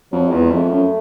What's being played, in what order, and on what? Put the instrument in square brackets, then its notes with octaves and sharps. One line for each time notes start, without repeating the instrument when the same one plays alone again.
[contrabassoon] F2 [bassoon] F#3
[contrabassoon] E2 [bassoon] G#3
[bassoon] G#3
[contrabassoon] F2 [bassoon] A3
[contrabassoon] F#2